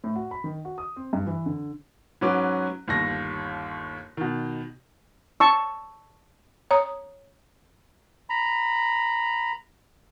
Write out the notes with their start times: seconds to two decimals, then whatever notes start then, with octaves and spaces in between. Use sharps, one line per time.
0.04 A2
0.16 F#4
0.31 B5
0.44 D#3
0.65 F#4
0.78 D#6
0.96 C4
1.13 G2
1.27 E3
1.46 D3
2.21 G#2 F#3 C#4 B4 D6
2.88 G1 D#2 A#6
4.17 B2 D#3
5.40 A5 C#6 E6
6.71 C#5 A#5 D#6
8.30 A#5 B5